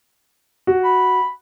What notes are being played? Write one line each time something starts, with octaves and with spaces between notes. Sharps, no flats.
F#4
B5